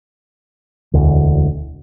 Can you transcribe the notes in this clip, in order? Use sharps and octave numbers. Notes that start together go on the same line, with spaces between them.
E1 D2